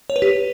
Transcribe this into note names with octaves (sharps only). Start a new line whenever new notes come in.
C#5
B4
G4